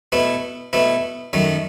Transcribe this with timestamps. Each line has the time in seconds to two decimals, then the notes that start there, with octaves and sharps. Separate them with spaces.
0.12 B2 A3 E4
0.73 B2 A3 E4
1.33 F#2 D#3 A3